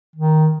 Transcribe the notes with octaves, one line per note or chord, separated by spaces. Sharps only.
D#3